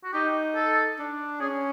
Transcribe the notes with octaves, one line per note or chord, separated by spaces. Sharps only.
F#4
D#4 G4
A4
D4
C#4 G#4